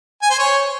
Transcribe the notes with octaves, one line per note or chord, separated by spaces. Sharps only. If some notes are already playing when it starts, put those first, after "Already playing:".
G#5
C5
C#5